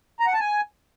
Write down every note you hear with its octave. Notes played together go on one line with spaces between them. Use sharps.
A#5
F#5
A5
G#5